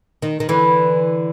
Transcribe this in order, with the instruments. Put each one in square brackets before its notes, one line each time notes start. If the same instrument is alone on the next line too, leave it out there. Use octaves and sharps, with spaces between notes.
[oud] D#3
D#3
D3 E3